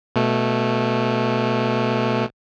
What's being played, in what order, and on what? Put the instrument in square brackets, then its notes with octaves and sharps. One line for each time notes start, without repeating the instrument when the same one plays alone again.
[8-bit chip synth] B2 A3